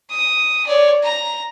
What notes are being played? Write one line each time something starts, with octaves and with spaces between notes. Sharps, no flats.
D#6
C#5 D5
A#5